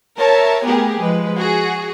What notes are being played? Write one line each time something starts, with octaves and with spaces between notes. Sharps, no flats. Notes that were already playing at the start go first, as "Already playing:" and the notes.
A#4 C#5 E5 A5
A3 B3 G4 G#4 A#4
F3 G#3 B4
F#4 G#4